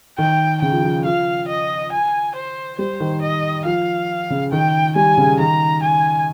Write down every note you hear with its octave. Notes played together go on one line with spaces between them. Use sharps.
D#3 G5
C#3 G5
F3
F3
F3 F5
D#5
G#5
C5
G3 C5
D#3
D#5
F3 F5
C#3
D#3 G5
G3 G#5
C#3
D#3 A#5
G#5